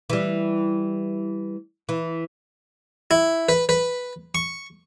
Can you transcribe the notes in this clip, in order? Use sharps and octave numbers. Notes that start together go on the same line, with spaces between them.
E3 G3
E3
E4
B4
B4
C#6